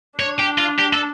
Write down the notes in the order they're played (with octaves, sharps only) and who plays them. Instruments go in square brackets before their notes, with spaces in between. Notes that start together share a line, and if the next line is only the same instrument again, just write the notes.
[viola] D4 [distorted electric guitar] C#5
[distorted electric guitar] G4
F4
G4
A4